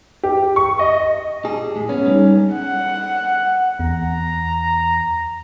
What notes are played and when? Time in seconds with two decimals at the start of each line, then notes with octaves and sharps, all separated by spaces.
0.23 G4
0.56 C#6
0.79 D#5
1.45 G4 G#4 A5
1.76 A2
1.89 B3 C#4 G#4
2.06 G3 D#4 A4
2.53 F#5
3.79 E2 A#5